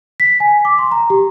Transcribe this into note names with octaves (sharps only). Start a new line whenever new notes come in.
B6
G#5
D6
C6
A#5
G4